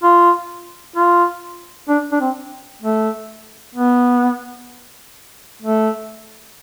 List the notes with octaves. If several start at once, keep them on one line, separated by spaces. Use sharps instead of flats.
F4
F4
D4
D4
C4
A3
B3
A3